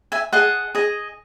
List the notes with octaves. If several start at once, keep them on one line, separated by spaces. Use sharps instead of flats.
E5 G#5
G#4 D#5 F#5 A5
G#4 D#5